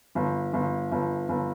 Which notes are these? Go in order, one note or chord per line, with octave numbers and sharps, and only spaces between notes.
G1
G1
G1
G1